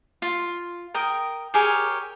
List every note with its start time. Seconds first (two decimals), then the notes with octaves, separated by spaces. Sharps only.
0.22 F4
0.94 A#4 G5 D#6
1.54 G4 G#4 A#4 C#5